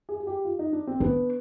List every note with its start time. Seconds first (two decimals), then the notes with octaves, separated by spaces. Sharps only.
0.09 G#4
0.20 G#4
0.27 G4
0.45 F4
0.59 D#4
0.73 D4
0.87 C4
1.00 B3 D4